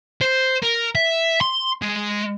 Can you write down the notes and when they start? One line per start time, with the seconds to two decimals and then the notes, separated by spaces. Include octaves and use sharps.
0.21 C5
0.62 A#4
0.95 E5
1.41 C6
1.82 G#3